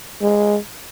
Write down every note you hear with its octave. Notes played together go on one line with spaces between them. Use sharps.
G#3